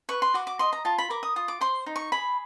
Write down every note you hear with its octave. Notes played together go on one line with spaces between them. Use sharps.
B4 C#6
C6
F#4 D6
D6
D#5 C6
A#5
F4 A5
B5
A#4 D6
D#6
F4 D#6
D6
C5 C6
D#4
C#6
G#4 B5